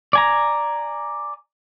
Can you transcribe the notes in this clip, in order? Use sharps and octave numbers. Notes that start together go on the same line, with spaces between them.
D5 G#5 A#5